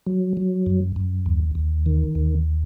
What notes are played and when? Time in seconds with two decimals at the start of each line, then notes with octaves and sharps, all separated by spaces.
0.07 F#3
0.37 F#3
0.66 F#2
0.96 F#2
1.26 D#2
1.55 D#2
1.86 D#3
2.15 D#2